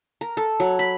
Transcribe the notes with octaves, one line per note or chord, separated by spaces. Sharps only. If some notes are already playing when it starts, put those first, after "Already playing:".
A#4
A4
F#3
B5